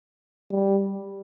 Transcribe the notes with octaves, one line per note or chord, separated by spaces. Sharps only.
G3